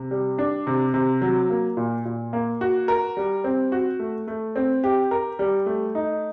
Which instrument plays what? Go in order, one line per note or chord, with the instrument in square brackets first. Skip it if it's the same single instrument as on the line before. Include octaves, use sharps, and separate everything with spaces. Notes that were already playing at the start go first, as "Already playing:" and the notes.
Already playing: [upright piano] C3
G3
D4
C3
C3
F#3
A#3
A#2
A#2
A#3
F#4
A#4
G3
C4
F#4
A3
A3
C4
G4
A#4
G3
A3
D#4